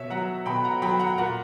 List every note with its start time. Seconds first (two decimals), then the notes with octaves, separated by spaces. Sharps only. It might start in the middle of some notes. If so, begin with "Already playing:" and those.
Already playing: B2 C#5 E5
0.10 F#3 F#5 A#5
0.46 B2 G5 B5
0.64 F#5 A#5
0.82 F#3 G5 B5
1.00 F#5 A#5
1.18 A#2 F#5 A#5